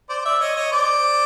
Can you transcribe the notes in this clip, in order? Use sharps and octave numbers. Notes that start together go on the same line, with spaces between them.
C5 D5
D5 E5
C#5 D#5
C#5 D#5
C5 D5